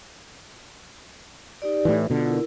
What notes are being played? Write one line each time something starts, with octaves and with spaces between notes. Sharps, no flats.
D#4 G4 D5
A2 E3
B2 D3 F4 F#4
E4 A#4